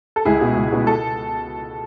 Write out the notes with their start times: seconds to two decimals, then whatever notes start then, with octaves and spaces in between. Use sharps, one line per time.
0.16 A4
0.25 C#2 E4 G#4
0.41 B2
0.56 C#2
0.72 B2
0.87 A4